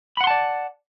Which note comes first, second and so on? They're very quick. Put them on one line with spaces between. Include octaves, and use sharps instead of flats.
B5 F#5 C6 A5 D5